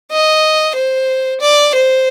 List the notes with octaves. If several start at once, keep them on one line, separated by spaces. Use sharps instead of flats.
D#5
C5
D5
C5